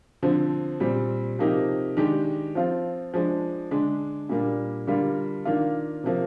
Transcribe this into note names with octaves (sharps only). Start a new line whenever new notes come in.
D3 F3 C4
A#2 G3 C4
C3 F3 A#3 D#4 G4
D#3 G#3 D4 G4
F3 C4 F4
F3 G#3 D4
D3 G#3 D4
A#2 G3 A#3 D4
D3 G3 A#3 F4
D#3 A#3 D4 F4
C3 F3 A#3